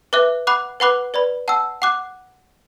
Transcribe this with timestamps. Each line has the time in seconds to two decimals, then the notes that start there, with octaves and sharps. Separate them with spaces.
0.13 B4 E5 D6 F#6
0.47 F#5 B5 D6 F#6
0.80 B4 F#5 B5 D6 F#6
1.14 B4 D5 B5
1.48 F#5 A5 E6
1.82 F#5 D6 F#6